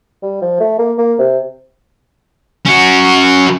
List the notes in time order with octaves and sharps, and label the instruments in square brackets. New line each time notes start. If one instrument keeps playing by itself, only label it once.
[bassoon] G3
F3
A3
A#3
A#3
C3
[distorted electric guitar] C#4 F#4